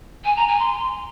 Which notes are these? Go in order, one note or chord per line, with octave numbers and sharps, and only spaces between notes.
G#5
A#5
G#5
C6